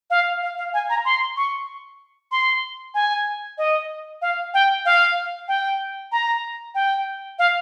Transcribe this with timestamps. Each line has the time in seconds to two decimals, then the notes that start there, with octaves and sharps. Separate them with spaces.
0.10 F5
0.42 F5
0.57 F5
0.74 G#5
0.90 A#5
1.05 C6
1.37 C#6
2.32 C6
2.94 G#5
3.58 D#5
4.22 F5
4.54 G5
4.85 F5
5.48 G5
6.12 A#5
6.75 G5
7.39 F5